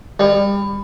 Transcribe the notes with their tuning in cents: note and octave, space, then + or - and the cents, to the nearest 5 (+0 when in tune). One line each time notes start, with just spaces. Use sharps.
G3 +30